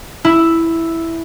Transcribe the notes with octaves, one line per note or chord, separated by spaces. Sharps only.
E4